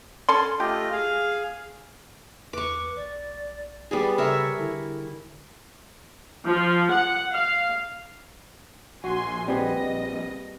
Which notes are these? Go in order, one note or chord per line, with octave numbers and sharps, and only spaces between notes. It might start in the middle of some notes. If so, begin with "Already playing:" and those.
C#4 A4 C6
A3 F4 G4 D#5
G#4 F5
E2 B4 C#6 D6
B1 D5
G3 B3 G#4 D5
C#3 A4 A#4 C#5 E5
D3 E4
F3
F#5
F5
A#1 F#4 G#5 C6
G3 B3 C4 G#4 D#5